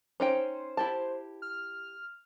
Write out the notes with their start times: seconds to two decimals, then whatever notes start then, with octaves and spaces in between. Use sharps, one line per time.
0.20 C#4 D#4 C5 G5
0.77 E4 G4 A5
1.42 F6